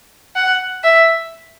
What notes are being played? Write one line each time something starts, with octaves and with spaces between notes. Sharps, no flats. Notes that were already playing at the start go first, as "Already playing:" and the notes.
F#5
E5